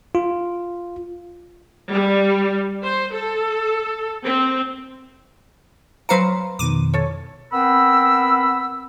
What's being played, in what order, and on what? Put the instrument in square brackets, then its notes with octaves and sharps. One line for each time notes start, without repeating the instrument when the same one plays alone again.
[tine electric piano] F4
[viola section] G3
C5
A4
C4
[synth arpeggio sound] F#3 F5 C#7 [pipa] B4 C5 A#5
[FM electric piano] F2 B2 D#3 [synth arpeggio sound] D6 D#7
[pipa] A4 C#5
[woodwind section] B3 C4 A#4 B5 E6